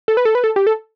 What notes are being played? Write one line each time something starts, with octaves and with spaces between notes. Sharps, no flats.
A4
B4
A4
B4
A4
G4
A4